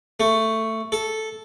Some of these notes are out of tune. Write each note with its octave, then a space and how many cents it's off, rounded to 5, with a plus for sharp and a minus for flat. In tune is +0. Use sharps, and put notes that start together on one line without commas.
A3 +15
A4 -5